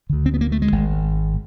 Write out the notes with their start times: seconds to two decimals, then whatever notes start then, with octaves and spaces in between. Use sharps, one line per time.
0.09 D2 D3
0.26 C4
0.34 B3
0.41 A#3
0.52 A3
0.62 G#3
0.72 G#1 G#2